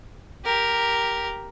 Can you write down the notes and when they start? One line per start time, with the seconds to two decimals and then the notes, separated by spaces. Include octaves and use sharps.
0.45 G4 A#4